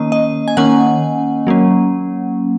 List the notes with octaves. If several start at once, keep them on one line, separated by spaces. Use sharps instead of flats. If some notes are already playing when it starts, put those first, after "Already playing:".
Already playing: D#3 A#3 C#4 D#5
D#5
G#5
D#3 A#3 C#4 F#5
F#3 A#3 C#4